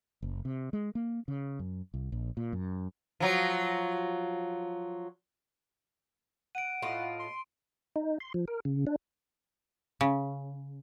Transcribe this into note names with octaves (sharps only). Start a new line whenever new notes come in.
F#1
C3
G#3
A#3
C#3
F#2
C2
A#1
A#2
F#2
F3 F#3
F#5 D7 D#7
A2 F4 D#5
C6
D#4
C6
F3
A#4
C#3
D4
C#3